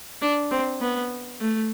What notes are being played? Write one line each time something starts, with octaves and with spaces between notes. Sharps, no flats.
D4
C4
B3
A3